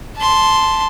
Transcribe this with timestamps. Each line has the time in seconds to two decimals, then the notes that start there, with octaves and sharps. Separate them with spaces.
0.16 A5 C6